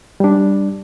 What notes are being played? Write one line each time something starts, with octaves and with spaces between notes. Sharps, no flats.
G3 D4